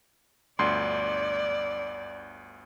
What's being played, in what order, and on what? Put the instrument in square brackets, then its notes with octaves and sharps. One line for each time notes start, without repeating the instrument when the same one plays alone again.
[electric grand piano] G1 D2 C6 [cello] D5